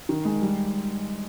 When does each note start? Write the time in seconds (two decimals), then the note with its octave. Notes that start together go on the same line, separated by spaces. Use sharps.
0.09 D#3
0.25 G#3
0.42 G3